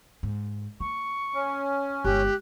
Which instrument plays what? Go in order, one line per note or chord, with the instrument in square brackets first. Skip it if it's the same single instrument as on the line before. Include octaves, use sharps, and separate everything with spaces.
[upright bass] G#2
[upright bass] A#3 [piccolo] C#6
[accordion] C#4
[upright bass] G1 G#3 [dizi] G4 [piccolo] F#6